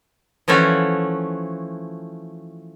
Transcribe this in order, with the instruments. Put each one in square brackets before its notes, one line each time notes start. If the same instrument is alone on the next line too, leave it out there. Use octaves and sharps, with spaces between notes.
[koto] E3 F3 A3 C#4 F#4